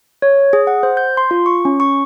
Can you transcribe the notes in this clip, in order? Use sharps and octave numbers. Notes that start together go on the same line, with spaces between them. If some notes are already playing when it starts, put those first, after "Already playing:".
C#5
G#4
F#5
C5
G6
C6
F4
C#6
C#4
C#6